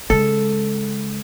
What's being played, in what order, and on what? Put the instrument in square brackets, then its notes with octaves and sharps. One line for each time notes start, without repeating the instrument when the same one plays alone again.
[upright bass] C#3 G#3 [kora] A4